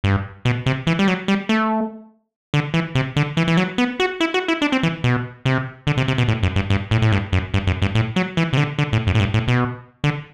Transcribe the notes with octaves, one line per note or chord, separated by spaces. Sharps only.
G2
B2
C3
E3
G3
F#3
G3
A3
D3
E3
C3
D3
E3
E3
F#3
B3
F#4
E4
F#4
E4
D4
C4
E3
B2
C3
D3
C3
C3
B2
A2
F#2
G2
G2
A2
A2
G2
F#2
G2
F#2
G2
A2
F#3
E3
C3
D3
D3
A2
F#2
A2
G2
A2
B2
D3